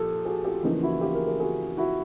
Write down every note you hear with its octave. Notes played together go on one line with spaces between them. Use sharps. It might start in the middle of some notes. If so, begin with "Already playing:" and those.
Already playing: A#2 F3 G4 A4
F#4 G#4
F4 G4
E2 C#3 F3 A#3 D#4 F4
E4 F#4
F4 G4
G#4 A#4
G#4 A#4
F#4 G#4
E4 F#4